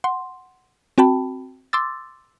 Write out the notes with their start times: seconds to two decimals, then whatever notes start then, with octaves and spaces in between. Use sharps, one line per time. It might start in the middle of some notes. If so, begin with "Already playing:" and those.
0.04 F#5 C6
0.98 C4 F#4 G5 A5 B5
1.73 C6 D6 E6 A6